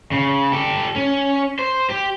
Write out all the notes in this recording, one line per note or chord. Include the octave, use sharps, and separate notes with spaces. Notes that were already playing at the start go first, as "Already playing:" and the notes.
C#3
G4 A4
C#4
C5
G4